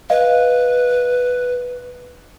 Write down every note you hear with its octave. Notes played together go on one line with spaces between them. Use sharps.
B4 D#5 F5